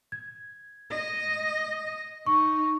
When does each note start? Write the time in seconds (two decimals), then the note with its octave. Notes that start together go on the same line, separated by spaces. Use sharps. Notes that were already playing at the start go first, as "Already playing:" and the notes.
0.12 G#6
0.90 D#5
2.26 D#4 C#6